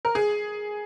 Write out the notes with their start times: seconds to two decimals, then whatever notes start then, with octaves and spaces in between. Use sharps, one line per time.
0.05 A#4
0.15 G#4